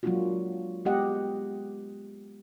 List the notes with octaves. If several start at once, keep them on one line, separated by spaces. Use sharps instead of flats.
F#3 G#3 A#3 D4 F4 F#4
G#3 B3 G4 D#5 F#5